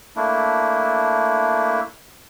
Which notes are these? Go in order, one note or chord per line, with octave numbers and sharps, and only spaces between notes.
A3 A#3 D4 E4